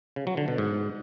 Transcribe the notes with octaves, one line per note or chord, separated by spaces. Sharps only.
C#3
F#3
D3
B2
G#2